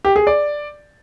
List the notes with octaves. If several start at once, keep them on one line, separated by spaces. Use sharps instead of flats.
G4
G#4
D5